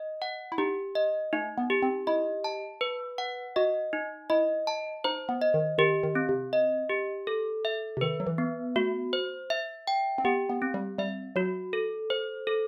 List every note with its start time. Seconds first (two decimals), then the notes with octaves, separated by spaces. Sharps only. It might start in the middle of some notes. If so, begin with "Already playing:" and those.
Already playing: D#5
0.22 F#5
0.52 E4
0.58 D#4 G4
0.95 D#5
1.33 A3 D#4
1.58 B3
1.70 G4
1.82 C4
2.07 E4 D#5
2.44 A5
2.81 B4
3.18 F#5
3.56 F#4 D#5
3.93 D#4
4.30 E4 D#5
4.67 A5
5.04 D#4 C5
5.29 B3
5.42 D#5
5.54 D#3
5.78 D#3 G4
6.03 D#3
6.15 C4
6.29 C3
6.53 D#5
6.90 G4
7.27 A4
7.65 E5
7.97 C3
8.01 D#3 B4
8.20 F#3
8.27 E3
8.38 B3
8.76 A3 F#4
9.13 C5
9.50 E5
9.87 G5
10.18 C4
10.25 B3 G4
10.49 B3
10.62 C4
10.74 G3
10.98 G3 E5
11.36 F#3 F#4
11.73 A4
12.10 C5
12.47 A4